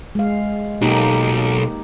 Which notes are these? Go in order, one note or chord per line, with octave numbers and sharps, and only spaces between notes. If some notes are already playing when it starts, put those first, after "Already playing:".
G#3 F5
B1 A#3 D#4 G4